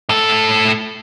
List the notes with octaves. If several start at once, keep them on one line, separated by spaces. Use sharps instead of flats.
A2 A4